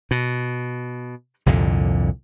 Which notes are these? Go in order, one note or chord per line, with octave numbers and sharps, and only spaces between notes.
B2
C2 F2 A#2 D3